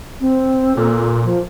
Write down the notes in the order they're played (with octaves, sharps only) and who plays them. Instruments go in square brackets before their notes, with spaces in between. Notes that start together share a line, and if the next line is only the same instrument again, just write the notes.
[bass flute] C4
[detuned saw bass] A#2 [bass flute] A4
[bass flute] F3